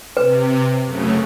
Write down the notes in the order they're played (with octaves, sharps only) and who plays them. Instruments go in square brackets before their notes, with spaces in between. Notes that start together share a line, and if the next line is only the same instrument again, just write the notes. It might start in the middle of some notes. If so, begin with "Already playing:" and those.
[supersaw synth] C3 [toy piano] B4
[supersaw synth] F#2 C#3 A3